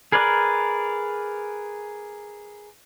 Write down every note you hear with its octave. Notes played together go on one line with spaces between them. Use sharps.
G#4 A#4 B4 D5